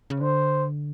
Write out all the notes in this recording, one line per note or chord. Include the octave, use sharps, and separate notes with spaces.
C#3
D3 C5